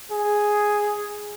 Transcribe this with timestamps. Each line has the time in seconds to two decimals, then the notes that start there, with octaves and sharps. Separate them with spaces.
0.12 G#4